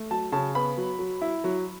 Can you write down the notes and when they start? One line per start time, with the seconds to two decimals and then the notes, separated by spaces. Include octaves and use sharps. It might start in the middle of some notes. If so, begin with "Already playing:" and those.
Already playing: A3
0.11 F#3 A5
0.32 C#3 A5
0.55 B3 B5
0.77 F#3
0.99 F#3
1.22 E4
1.44 F#3